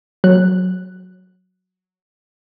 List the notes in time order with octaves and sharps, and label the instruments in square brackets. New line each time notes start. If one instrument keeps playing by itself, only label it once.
[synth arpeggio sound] F#3 F#6